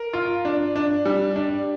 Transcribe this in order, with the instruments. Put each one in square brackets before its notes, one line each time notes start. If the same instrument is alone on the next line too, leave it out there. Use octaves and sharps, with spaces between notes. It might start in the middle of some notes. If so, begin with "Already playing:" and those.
Already playing: [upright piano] A#4
F4
D4
D4
G3
D4